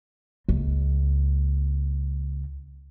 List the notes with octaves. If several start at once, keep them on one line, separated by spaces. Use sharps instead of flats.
C#2 A#3